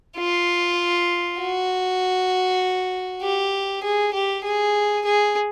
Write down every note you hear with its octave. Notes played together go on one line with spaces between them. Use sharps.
F4
F#4
G4
G#4
G4
G#4
G#4